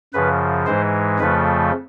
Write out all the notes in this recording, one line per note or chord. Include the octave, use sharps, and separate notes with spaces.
F#2 C#3 F3 B4
G#2 E3 G#3 C5
F2 C#3 F3 A3 B4